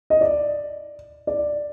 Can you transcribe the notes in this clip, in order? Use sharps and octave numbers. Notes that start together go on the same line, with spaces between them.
D#5
D5
D5